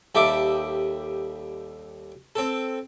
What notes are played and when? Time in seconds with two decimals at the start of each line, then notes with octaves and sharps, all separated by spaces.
0.15 D#2 G3 A4 E5 D6
2.35 C4 A4